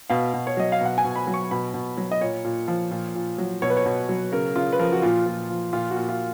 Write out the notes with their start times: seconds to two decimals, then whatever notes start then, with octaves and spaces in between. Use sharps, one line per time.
0.10 B2 F5
0.33 B2
0.47 C#5
0.57 F#3 D#5
0.72 F5
0.81 B2 F#5
0.98 G#5
1.04 B2
1.16 B5
1.27 F#3
1.34 C#6
1.51 B2 B5
1.74 B2
1.97 F#3
2.12 D#5
2.21 A#2 C#5
2.44 A#2
2.68 F3
2.91 A#2
3.15 A#2
3.38 F#3
3.62 B2 C#5
3.70 B4
3.77 C#5
3.85 B2
4.09 F#3
4.32 C#3 A#4
4.56 C#3 F4
4.72 B4
4.79 F3 A#4
4.92 F#4
5.02 A#2 F4
5.26 A#2
5.50 F3
5.73 A#2 F4
5.91 F#4
5.96 A#2
6.09 F4